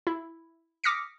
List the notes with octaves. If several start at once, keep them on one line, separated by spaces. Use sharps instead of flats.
E4
D6 D#6 F6 A#6 B6 C#7